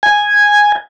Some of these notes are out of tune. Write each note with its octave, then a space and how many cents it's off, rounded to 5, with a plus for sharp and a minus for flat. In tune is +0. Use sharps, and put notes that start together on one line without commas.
G#5 -5